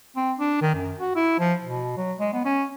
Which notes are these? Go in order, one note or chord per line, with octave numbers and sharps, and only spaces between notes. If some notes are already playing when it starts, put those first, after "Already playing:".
C4
D4
D#3
F#2
F#4
E4
F3
B2
F#3
G#3
B3
C#4